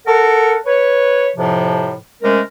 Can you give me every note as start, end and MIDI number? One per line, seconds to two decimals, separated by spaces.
0.06 0.55 69
0.06 0.55 70
0.06 0.55 78
0.66 1.28 71
0.66 1.28 73
1.37 1.93 41
1.37 1.93 45
1.37 1.93 48
1.37 1.93 53
2.22 2.40 48
2.22 2.40 56
2.22 2.40 57
2.22 2.40 61
2.22 2.40 70